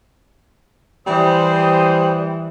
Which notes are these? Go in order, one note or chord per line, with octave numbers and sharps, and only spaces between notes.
E3 G3 C5 D#6